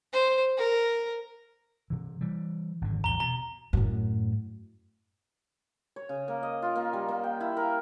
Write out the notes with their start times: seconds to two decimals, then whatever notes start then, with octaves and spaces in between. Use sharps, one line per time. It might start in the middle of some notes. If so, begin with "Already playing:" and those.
0.13 C5
0.57 A#4
1.90 C3 E3
2.21 E3 G3
2.81 G#1 F2 D3
3.04 A1 E2 A#5 G7
3.20 B2 A#5
3.73 F#2 A2
5.96 C#5
6.09 C#3
6.28 A#3
6.43 D#5
6.62 F4
6.76 A#3
6.93 G3
7.09 A#3
7.24 G5
7.40 E4
7.57 A#4